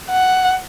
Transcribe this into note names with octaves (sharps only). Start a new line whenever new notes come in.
F#5